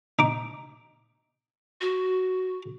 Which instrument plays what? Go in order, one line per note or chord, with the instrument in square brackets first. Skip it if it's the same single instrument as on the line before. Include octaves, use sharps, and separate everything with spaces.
[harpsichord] D#4 D6
[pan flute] F#4